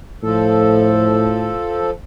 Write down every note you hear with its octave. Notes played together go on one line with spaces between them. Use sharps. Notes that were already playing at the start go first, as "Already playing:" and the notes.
A2 F3 A4